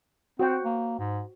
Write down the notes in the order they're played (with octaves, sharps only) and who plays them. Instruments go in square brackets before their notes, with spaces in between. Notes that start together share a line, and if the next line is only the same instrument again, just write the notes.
[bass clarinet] C4 [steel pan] F#4 C5 G5
[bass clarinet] A#3
G#2